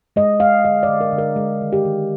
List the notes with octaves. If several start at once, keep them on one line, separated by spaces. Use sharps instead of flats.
G#3 D#5
G#3 F5
D3 D#5
D5
D3
A#4
D3
A#4
G#3
D#3
G4
D#3